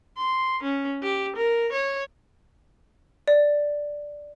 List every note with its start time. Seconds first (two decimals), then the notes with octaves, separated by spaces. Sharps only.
0.17 C6
0.63 C#4
1.03 G4
1.36 A#4
1.73 C#5
3.28 D5